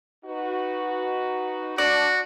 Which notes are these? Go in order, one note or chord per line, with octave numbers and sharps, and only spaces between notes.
D#4 F#4 B4
D4 F#4 D5